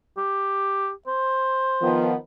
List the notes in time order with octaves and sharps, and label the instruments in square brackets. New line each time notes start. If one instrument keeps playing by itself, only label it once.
[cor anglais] G4
C5
[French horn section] D#3 F3 B3